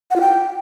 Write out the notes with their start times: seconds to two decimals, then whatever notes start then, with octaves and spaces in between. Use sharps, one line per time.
0.11 F#5
0.16 F4
0.21 G5